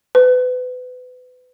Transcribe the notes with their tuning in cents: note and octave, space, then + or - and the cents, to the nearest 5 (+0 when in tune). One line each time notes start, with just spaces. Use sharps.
B4 +30